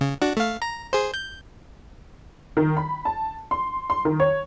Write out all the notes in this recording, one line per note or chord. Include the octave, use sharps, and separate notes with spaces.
C#3
D4 F#4
A3 F5
A#5
G#4 C5
G6
D#3
B5
A5
C6
C6
D#3
C#5